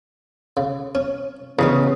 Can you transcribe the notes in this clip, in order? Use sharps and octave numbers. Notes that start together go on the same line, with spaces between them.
C#3
C#4
A1 C#3 B3 D4 D#4